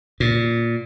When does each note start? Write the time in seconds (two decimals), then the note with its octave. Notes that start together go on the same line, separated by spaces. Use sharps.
0.20 A#2